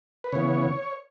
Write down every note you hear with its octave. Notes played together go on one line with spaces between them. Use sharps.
B4
C#3 E3 B3 C#5